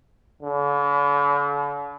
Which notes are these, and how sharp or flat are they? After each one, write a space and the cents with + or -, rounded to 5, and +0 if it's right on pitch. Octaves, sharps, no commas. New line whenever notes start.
D3 -45